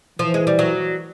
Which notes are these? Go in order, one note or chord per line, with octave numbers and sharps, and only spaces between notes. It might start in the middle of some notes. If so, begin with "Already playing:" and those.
E3 F3
G#3
G3
F#3